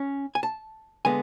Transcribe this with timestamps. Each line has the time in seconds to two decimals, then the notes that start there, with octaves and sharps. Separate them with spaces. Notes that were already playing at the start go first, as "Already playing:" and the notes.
Already playing: C#4
0.35 G#5
0.43 A5
1.05 D3 G#3 B3 G#5